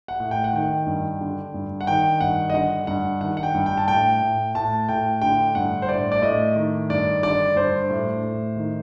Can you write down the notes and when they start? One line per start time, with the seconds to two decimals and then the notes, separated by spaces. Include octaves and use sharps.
0.08 F#5
0.20 A2
0.31 G5
0.44 F#5
0.53 D#3 G5
0.86 G2
1.21 D3
1.54 G2
1.81 F#5
1.87 D#3 G5
2.20 G2 F#5
2.50 D#5
2.54 D3 F#5
2.87 G2 F#5
3.21 D#3 F#5
3.37 F#5
3.43 G5
3.55 G2
3.66 G5
3.77 A5
3.88 A2 G5
4.22 A2
4.55 A2 A5
4.89 A2 G5
5.22 D3 G5
5.55 G2 F#5
5.82 C5
5.89 A2 D5
6.12 D5
6.22 A2 D#5
6.56 D#3
6.90 G2 D5
7.23 D3 D5
7.56 G2 C5
7.90 A2
8.23 A2
8.56 D#3